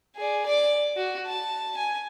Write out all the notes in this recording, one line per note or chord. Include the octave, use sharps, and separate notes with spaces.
G#4 D5
D5 D6
F#4
A5
G#5